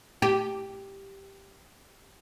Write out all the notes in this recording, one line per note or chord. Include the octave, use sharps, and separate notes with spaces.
G4